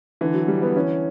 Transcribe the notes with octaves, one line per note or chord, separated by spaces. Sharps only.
D3 E3
F#3
D3 G3
B3
E3 C#4